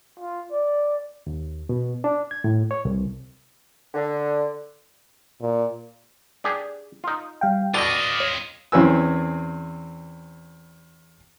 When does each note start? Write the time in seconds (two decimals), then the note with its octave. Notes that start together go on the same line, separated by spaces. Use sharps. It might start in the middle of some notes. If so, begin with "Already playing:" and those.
0.20 F4
0.52 D5
1.27 D#2
1.69 B2
2.04 D4
2.31 G#6
2.44 A2
2.71 C#5
2.85 C2
3.94 D3
5.41 A#2
6.44 D4 G4 G#4
7.04 D#4 F4
7.41 G3 F5 G5
7.74 B2 D3 F4 D#5 D6 A6 A#6
8.20 C#5
8.72 E2 C4 C#4 B4 G#5 E6